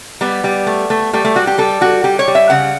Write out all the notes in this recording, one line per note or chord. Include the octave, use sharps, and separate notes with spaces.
G3 B3
G3
A3
A3
G3 A3
A3
G3 F#4
G4
G3 A4
G3 F#4
G3 G4
C#5
G3
E5
C#3 F#5